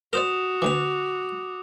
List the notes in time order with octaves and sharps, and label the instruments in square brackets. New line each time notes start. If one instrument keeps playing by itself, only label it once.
[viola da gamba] F#4 [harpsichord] A#4 C5 D5 [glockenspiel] D#6 E7 F7
[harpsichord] D2 E3 [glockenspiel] D6 F7